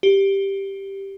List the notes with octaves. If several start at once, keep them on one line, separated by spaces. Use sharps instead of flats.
G4